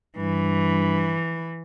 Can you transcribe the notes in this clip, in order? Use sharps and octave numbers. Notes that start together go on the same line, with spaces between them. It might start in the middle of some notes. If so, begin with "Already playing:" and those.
G2 E3